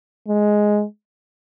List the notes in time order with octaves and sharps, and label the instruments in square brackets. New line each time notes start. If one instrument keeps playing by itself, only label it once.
[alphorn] G#3